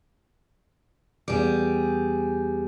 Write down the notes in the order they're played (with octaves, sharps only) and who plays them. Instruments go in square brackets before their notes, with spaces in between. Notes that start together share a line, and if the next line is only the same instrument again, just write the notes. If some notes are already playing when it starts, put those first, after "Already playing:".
[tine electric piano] E2 B3 D6 [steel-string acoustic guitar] G3 G#4